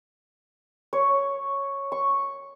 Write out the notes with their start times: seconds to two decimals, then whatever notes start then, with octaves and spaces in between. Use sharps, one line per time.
0.93 C#5
1.92 C#6